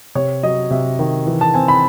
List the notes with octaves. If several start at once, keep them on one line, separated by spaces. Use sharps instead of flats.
C3 C#5
F#3 D#5
C3 E5
D#3
E3
A5
C4 G#5
B5